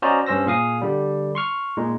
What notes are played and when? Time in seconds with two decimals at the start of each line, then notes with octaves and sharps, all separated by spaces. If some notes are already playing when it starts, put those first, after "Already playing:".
0.02 C#4 F#4 C5 D5 D#5 A#5
0.26 G2 C#4 C5 E6 A#6
0.46 A#2 G#4 F5 D#6
0.81 D3 G3
1.35 C6 C#6 F6
1.77 A#2 G#3 D#4